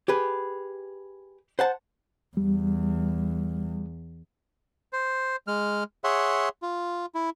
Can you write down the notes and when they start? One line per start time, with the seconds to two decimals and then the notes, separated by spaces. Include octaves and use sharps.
0.08 G4 G#4 B4
1.59 C5 F#5 A5
2.37 E2 G3
4.93 C5
5.47 G#3 F6
6.04 G#4 C#5 E5 F#5 C6
6.62 F4
7.15 E4